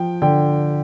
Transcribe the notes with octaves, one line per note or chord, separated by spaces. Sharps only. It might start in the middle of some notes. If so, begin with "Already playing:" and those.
Already playing: F3 G5
D3 G5